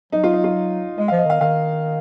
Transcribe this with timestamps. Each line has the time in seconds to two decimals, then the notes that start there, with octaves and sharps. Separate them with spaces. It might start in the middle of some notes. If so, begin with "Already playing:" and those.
0.12 F#3 D#4
0.24 F4
0.33 D#4
0.44 F4
0.98 G#3 D#5
1.08 F3 F5
1.18 D#5
1.26 D#3 F5
1.41 D#3 F5